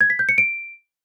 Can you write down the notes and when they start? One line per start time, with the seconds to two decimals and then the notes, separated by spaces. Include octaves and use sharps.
0.01 G#6
0.10 B6
0.19 G6
0.29 C#7
0.38 D7